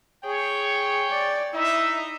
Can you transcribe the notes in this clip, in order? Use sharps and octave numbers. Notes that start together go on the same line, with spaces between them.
G#4 C#5 G5
D5
D#4 E4 E5